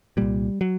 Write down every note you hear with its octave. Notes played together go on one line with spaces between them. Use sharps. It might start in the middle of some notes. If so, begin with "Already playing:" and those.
C2 A#2 G3
F#3